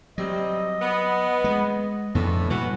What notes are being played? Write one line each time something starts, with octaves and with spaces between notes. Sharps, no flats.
C3 F#3 G3 C4 D#5
B3
G#3
F2 A2 D3 E3 B3
A#2 E3 G3 B3 F#4